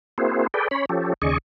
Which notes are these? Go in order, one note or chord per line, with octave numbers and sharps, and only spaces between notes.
A#3 C4 E4 F#4 G#4 C5
G#4 A4 B4 D5 G5
C#4 C#5 B5
F3 C#4 G4 A4
D#2 C#3 G#4 D5 D#5 C#6